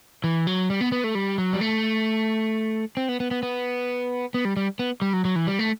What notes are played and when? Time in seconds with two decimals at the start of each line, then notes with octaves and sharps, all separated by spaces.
0.24 E3
0.47 F#3
0.70 G3
0.81 B3
0.92 B3
1.04 A3
1.15 G3
1.38 F#3
1.53 G3
1.61 A3
2.97 C4
3.09 B3
3.20 B3
3.31 B3
3.43 B3
4.34 B3
4.45 G3
4.57 G3
4.79 B3
5.02 G3
5.13 F#3
5.25 F#3
5.36 E3
5.47 G3
5.59 A3